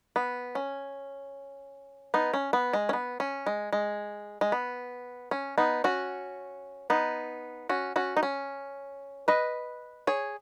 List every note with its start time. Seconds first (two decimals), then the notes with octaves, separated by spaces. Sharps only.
0.16 B3
0.55 C#4
2.14 B3 D#4
2.34 C#4
2.53 B3
2.73 G#3
2.89 C#4
2.93 B3
3.20 C#4
3.47 G#3
3.73 G#3
4.41 G#3
4.52 B3
5.31 C#4
5.58 B3 D#4
5.84 C#4 F#4
6.90 B3 D#4
7.69 C#4 F#4
7.96 C#4 F#4
8.17 D#4
8.23 C#4
9.28 B4 D#5
10.07 G#4 C#5